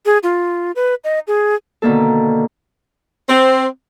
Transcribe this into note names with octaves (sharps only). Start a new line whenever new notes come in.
G#4
F4
B4
D#5
G#4
B2 D3 D#3 A#3 A4
C4